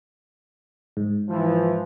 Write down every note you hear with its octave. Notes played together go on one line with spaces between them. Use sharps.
G#2
E3 F3